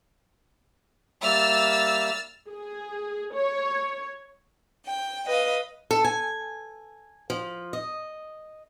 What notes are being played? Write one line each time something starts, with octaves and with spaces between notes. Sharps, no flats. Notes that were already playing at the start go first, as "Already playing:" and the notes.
G3 A#3 E5 E6 F6 A6
G#4
C#5
G5
B4 D#5 F5
A4
G#5
F3
D#5